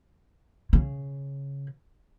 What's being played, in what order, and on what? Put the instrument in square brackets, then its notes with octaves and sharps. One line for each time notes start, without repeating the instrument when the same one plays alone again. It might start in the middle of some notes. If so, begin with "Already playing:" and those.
[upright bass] C#3